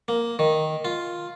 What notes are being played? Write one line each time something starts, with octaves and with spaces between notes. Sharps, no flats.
A#3
D#3
F4